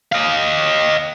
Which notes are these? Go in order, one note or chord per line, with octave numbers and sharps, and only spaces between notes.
D#5 F5